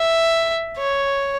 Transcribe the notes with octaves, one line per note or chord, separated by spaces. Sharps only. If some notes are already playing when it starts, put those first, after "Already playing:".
Already playing: E5
C#5